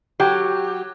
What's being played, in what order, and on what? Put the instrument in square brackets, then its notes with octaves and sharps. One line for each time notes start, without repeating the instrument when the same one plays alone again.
[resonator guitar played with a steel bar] F#3 G4